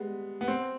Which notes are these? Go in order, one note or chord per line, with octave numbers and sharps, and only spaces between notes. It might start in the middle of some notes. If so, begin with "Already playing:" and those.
Already playing: G3 G#3 B3
B3
C4